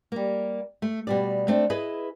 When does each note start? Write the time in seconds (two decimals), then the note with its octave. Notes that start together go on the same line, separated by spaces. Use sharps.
0.12 G3 A#3
0.82 A3
1.07 B2 G3 D5
1.48 A3 C4 D4
1.70 E4 G#4 B4 D#5